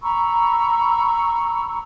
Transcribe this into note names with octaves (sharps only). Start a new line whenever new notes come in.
A#5 B5 C#6 E6